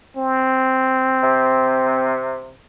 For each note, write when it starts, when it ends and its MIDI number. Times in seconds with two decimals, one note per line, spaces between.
0.17 2.18 60
1.23 2.50 48